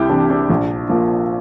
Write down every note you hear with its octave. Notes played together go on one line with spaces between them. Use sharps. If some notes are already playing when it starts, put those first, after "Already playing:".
Already playing: C2 E4 G4
C3 E3 D4
D4
A#1
A#2 F3